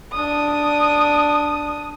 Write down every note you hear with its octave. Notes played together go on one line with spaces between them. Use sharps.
D4 D#6